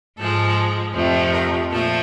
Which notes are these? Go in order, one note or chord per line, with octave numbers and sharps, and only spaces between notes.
G#2 F3 G#3 A4
F2 C3 F3 A3
A#4
A#2 F3 A3 A4